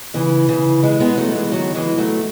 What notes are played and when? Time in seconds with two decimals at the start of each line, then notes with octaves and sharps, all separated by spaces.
0.14 C#3 E3
0.48 C#3 E3
0.83 E3 G#3
1.00 G#3 B3
1.17 F#3 A3
1.35 E3 G#3
1.52 D#3 F#3
1.75 E3 G#3
1.98 F#3 A3